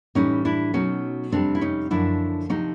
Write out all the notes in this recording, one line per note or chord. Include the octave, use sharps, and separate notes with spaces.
A2 E3 G3 C#4 D#4
D4 E4
B2 F#3 A3 C#4 D#4
F2 C3 D#3 G3 C4 D4
E4
C#4 D#4
F#2 D3 F3 A3 D4 E4
D2 C3 F3 A3 C#4 D#4